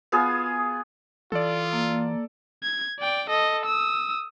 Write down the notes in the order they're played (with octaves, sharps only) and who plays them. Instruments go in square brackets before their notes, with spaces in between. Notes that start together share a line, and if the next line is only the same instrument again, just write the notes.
[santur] B3 F4 G#4
[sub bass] E3 [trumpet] F4 [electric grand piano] A4 D5
[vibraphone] A#3
[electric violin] G#6
D5 G5
A4 D#5
D#6 E6